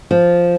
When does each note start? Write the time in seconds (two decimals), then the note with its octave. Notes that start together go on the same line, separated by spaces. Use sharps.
0.11 F3